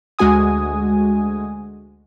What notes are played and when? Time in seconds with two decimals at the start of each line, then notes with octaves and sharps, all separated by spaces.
0.19 D2 G#3 F#4 G#5 D#6